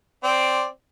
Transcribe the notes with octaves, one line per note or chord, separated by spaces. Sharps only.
C4 D5